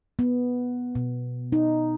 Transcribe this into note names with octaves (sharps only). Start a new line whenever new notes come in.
B3
B2
D#4